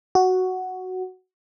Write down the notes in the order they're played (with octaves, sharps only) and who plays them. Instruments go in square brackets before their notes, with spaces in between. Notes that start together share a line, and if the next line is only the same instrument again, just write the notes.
[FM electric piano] F#4